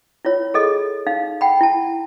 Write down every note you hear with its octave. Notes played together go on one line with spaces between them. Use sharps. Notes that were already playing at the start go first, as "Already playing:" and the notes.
E4 F4 C#5
G#4 A4 D#5
D#4 F5
F#5 G5 B5
E4 A5